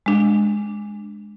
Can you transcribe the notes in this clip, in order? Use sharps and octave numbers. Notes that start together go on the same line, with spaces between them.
G#3 D4